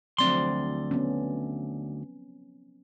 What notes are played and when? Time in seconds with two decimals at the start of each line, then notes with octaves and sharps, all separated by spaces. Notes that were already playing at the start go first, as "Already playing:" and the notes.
0.18 D2 F3 F#3 C4 D5 C6
0.91 B3 C#4